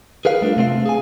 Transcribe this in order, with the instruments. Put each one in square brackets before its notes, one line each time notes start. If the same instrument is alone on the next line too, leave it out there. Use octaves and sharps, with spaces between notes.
[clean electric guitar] G#4 A#4 B4 F5
G3 A3 D4 F4
C3 A3 C4 F5
G#4 G#5